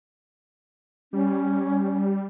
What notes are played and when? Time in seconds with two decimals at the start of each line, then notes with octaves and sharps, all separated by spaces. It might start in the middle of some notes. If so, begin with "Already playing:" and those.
1.13 G3 C#4